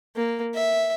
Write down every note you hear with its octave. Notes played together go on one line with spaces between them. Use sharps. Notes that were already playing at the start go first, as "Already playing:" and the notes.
A#3
E5